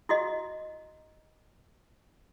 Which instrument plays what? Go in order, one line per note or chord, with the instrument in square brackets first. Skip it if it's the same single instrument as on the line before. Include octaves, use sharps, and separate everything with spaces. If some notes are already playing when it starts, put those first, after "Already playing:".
[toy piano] E4 F#4 D#5